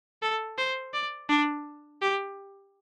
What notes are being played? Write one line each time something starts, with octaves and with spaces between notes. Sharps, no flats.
A4
C5
D5
D4
G4